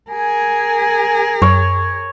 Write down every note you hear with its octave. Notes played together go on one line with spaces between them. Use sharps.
G#4 A#4 G#5
F#2 C#5